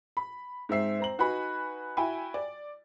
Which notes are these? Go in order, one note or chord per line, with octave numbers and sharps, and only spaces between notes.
B5
G#2 C4 E5 C7
C4 A#5 F#7
D#4 F#4 B4 G#5 B5
E4 F#4 G5 G#5 B5
D5